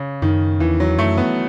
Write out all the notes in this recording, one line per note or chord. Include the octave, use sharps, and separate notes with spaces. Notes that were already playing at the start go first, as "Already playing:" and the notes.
Already playing: C#3
F#2 D#3
E2 E3
F#3
F#2 A3
B3